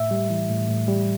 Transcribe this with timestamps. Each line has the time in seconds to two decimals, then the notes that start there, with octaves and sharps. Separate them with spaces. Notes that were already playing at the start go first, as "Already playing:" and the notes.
Already playing: A2 E5
0.11 G3
0.30 E3
0.49 A2
0.69 A2
0.88 G3